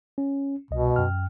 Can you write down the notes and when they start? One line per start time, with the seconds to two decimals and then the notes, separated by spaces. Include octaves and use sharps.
0.18 C#4
0.71 C2 B2 D#5
0.96 F#2 G5 F6